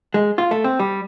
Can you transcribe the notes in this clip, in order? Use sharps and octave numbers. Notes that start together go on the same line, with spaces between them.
G#3
F4
A3
C4
G3